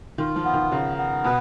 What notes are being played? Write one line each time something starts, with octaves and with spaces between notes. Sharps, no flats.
D#3 F4
F3
B3
D#3
C#3 A#4
B3
B2 B4